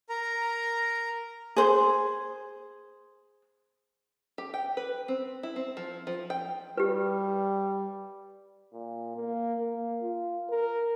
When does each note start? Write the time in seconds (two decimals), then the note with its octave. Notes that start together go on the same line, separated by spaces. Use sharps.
0.09 A#4 A#5
1.56 G#4 C5
4.38 G4
4.54 G5
4.77 B4
5.08 C4
5.43 E4
5.56 C4
5.77 F3
6.07 F3
6.30 G5
6.77 G3 G4 B4
8.73 A#2
9.16 A#3
9.59 A#3
10.02 F4
10.50 A#4